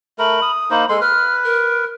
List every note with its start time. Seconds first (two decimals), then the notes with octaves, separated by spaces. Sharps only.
0.19 A3 A#4 B5
0.42 D#6
0.70 A#3 D#4 C5 B5
0.89 G#3 A4 C6
1.01 B4 F6
1.44 A#4